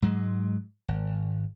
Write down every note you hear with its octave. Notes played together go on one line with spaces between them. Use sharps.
G#2 F#3 G#3
G#1